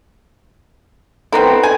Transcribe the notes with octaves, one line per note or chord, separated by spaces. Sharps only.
B3 C4 E4 A4 G5 A#5
G#5